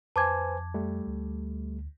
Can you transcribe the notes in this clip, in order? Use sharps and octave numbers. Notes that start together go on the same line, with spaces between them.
F2 B4 C5 G#5 A5 D6 G#6
G3 A3
D2